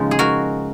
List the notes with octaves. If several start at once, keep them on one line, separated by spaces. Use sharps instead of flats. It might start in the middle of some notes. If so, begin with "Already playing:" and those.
Already playing: C#3 F3 G#3 B3 C#4 D#4
G#4
F#4 A#4